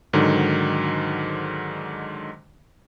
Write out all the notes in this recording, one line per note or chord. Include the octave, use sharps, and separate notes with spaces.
G#2 D3 D#3 F#3